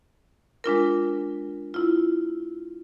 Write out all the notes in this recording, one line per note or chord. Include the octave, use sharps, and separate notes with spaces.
G#3 D4 F4 A#4
E4 F4